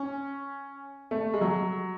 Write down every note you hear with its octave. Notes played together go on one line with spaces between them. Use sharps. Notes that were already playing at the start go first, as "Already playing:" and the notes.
Already playing: C#4
A3
G#3
F#3